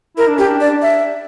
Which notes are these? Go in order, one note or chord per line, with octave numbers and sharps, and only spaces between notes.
E4 A#4
D4
C#4 G4
D4
D5
E5